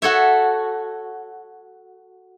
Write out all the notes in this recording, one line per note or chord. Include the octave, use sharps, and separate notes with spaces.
F#4 A4 C#5 E5